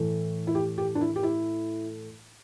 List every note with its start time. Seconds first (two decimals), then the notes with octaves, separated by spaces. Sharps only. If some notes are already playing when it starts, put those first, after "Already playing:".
Already playing: A2 E3 A3
0.47 E4
0.55 G4
0.78 G4
0.95 D4
1.01 E4
1.16 G4
1.23 E4